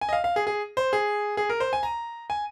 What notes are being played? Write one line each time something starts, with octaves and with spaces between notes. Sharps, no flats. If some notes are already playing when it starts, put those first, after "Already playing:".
G#5
D#5
F5
F5
G#4
G#4
C5
G#4
G#4
A#4
C5
G#5
A#5
G#5